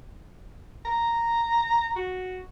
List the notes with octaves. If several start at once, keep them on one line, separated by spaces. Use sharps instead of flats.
A#5
F#4